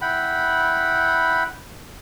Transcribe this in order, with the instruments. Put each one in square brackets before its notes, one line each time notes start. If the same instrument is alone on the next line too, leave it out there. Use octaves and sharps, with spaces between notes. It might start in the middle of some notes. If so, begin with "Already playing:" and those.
[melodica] E4 F#5 G5 B5